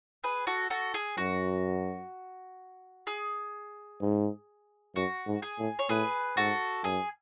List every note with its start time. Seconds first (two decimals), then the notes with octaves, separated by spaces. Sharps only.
0.24 G#4 B4
0.47 F#4 A4
0.70 F#4 A4
0.94 G#4
1.17 F#2 F#4
3.07 G#4
4.01 G#2
4.95 F#2 F#4
5.27 G#2
5.42 G#4
5.59 A2
5.79 C#5
5.89 A2 G#4 B4
6.37 G#2 F#4 A4
6.84 F#2 G#4